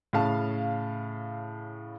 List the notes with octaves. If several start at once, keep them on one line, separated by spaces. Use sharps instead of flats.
A2 C#3 F5 A5